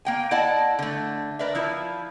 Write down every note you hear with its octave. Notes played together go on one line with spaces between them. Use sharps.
A#3 G5 G#5
E4 D5 D#5 F#5 A5
D3 A3
A#4 B4 D5 E5
F3 E4 F4